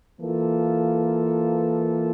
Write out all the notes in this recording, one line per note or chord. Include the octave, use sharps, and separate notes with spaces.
E3 A#3 F4 A4